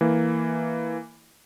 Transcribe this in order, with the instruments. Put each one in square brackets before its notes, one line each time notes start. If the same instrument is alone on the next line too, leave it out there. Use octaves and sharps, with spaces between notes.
[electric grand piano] E3 A#3